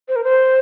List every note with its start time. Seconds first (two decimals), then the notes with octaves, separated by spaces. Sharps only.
0.08 C5
0.16 A#4
0.24 C5